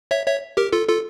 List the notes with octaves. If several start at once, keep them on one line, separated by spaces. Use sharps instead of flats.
C#5 E5
C#5 E5
G4 A#4
F4 A4
F4 A4